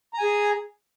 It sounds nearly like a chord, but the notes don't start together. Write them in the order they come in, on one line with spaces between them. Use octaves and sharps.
A#5 G#5 G#4